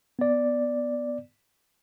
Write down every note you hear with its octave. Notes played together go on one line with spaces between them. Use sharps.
B3 D5